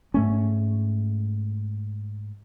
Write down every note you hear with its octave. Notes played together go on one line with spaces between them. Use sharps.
G#2 A3 C#4